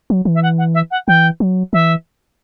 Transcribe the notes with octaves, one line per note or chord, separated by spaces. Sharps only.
F#3
E3
E5
F#5
F#5
E5
F#5
E3 G5
F#3
E3 E5